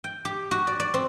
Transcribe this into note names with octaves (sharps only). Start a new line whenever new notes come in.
G5
G4
F#4
D5
D5
C4